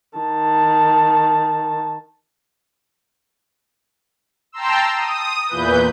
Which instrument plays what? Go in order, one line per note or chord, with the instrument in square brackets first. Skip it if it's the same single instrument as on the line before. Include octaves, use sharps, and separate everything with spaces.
[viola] D#3 A5
[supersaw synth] G5 A5 A#5 C6 E6
D#6
E2 A#2 E3 B4 G6